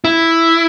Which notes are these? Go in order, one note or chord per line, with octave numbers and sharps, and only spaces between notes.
E4